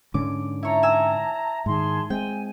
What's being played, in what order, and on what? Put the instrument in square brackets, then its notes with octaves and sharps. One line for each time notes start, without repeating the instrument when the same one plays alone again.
[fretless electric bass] G#2 D3 C#4 [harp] D6
[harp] E4 C#5 [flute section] A5 A#5
[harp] G#5 E6
[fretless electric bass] G#2 D#3 [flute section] G#4 A5 C6
[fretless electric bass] G#3 C4 [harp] G5 [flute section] G#5